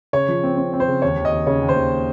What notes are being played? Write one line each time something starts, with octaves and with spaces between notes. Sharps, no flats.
C#3 C#5
F3
C4
C4
C4
C5
C#3
D#2 C#5
D#2
D#5
D#2
C#3 C#5
D#2
C5
D#2